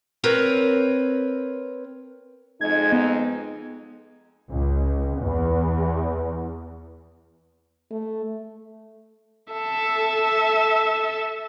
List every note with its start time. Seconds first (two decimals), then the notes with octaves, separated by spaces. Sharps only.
0.24 C4 A#4 B4 C#5
2.61 F2 G#3 D#4 G#6
2.92 B3
4.50 C#2
5.21 E2
7.91 A3
9.53 A4 E5